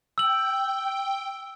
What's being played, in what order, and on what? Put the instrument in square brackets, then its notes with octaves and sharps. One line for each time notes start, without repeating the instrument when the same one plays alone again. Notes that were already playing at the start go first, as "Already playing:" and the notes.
[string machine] G5 [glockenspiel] E6 F#7